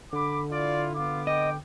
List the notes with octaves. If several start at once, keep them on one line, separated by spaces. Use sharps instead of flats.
D3 B5 D6
E4 F4 D5
B3 F4 D6
D#5 G5